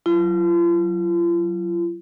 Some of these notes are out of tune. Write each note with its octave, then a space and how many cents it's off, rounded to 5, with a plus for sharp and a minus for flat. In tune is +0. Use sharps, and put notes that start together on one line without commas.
F#3 +0 F4 -40